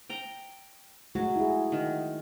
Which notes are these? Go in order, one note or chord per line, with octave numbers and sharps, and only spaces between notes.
G5 A#5
F#3 G#3 A3 F#4
E4 G#4
D#3